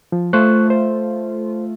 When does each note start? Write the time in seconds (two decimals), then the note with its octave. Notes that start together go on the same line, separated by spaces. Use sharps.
0.12 F3
0.33 A3 F4 C5 C#6 F#6
0.70 C5